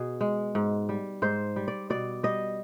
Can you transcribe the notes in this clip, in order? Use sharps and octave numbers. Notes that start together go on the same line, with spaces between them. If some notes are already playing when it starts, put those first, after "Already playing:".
Already playing: B2 G#4
G#3
G#2
G3
G#2 C5
G3
D5
B2 D5
G3 D#5